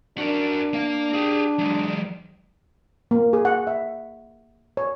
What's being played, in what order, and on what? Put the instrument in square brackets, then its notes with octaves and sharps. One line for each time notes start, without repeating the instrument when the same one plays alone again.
[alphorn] D4 [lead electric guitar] F#4 A#4
[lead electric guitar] A#3 F5
G4 G#4
F#3 G#3
[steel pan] A#3
G#4
F#5
E5
C#5